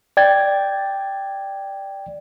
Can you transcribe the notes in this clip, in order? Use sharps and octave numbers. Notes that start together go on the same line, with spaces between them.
D5 G5 G#6 A6